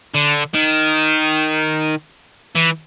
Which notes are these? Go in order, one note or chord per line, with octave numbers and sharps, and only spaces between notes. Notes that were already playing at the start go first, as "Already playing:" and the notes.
D3
D#3
E3